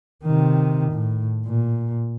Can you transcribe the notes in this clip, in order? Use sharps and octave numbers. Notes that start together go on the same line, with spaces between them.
C3 D#3
A2
A#2